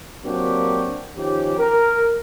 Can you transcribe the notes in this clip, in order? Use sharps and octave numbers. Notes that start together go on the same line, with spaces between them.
F#3 A#3 C4 D4 F#4 G4
D#3 F3 C#4 G4
A#4